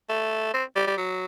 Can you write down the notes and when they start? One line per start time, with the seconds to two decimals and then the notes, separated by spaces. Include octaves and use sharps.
0.09 A3
0.54 C4
0.76 G3
0.87 G3
0.97 F#3